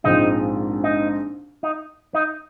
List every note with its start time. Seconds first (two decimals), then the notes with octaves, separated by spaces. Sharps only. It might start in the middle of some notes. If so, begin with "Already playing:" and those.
0.04 A#1 G#2 F3 G#3 C4 D#4
0.84 D#4
1.63 D#4
2.15 D#4